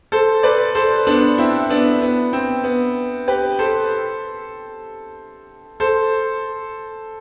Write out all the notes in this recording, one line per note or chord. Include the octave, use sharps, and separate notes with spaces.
A4 C5
B4 D5
A4 C5
B3 D4
C4 E4
B3 D4
B3
C4
B3
G4 B4
A4 C5
A4 C5